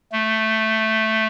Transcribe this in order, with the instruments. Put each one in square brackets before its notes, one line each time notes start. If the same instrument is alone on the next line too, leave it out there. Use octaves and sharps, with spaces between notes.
[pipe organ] A3